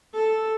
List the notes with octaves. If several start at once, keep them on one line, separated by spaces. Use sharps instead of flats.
A4